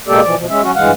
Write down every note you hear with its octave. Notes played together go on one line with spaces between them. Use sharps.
B2 G#3 A#3 G4 A4 D5
B2 E3 F3 D5
B2 F3
G#3 C#4 E5
F#3 C#4 F#4
G2 E3 G#3 F5 F#5